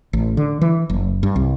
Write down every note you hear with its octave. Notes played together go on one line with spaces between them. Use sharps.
A1
D3
E3
F#1
G2
C2